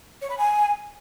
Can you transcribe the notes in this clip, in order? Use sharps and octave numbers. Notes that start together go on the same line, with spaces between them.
C#5
B5
G#5